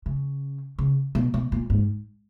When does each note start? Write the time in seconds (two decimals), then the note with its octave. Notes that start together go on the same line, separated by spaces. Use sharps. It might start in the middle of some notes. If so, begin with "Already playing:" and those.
0.06 C#3
0.79 C#3
1.15 B2
1.34 B2
1.52 A#2
1.70 G#2